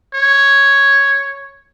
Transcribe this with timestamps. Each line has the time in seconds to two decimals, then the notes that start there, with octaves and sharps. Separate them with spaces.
0.14 C#5